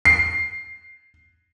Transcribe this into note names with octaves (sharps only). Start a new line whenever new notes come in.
C7